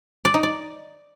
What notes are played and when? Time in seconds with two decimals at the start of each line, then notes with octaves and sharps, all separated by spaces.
0.25 D5
0.34 D#4
0.43 D5